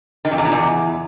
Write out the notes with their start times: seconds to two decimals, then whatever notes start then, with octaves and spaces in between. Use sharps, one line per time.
0.25 D#3
0.31 F2
0.38 E2
0.45 A#2
0.52 E2